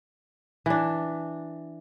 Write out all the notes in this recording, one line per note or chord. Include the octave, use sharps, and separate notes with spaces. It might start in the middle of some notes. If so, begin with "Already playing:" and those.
E3 D4